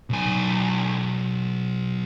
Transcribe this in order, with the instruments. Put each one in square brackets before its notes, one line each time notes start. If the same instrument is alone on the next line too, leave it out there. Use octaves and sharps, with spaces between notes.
[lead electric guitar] B1 G#5